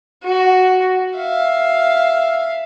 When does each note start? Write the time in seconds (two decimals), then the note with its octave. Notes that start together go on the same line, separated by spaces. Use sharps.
0.23 F#4
1.17 E5 F5